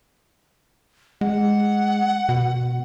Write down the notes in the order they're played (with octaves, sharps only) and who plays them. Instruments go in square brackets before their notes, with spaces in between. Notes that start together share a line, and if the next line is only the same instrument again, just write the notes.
[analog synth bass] G#3 [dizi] F#5
[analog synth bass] B2